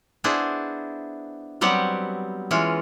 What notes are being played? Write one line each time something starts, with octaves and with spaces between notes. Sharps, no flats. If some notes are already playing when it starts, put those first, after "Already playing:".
B3 D4 E4 G#4 C5
F#3 G3 B3 C4 G4 F#5
E3 G#3 C#4 F4